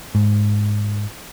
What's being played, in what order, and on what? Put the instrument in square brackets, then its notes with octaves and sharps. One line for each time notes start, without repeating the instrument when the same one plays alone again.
[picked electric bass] G#2